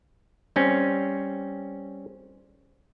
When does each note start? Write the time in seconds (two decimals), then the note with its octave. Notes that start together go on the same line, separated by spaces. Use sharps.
0.56 G3 C4 C#4